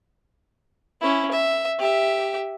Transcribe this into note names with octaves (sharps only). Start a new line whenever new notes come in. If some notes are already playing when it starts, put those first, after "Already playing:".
C#4 E4
E5
G4 E5